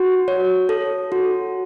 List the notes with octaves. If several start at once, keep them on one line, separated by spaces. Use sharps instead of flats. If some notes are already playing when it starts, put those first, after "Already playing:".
Already playing: F#4
C#5
A4
F#4